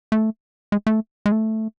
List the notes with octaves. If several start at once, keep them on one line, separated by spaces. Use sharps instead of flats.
A3
G#3
A3
G#3
A3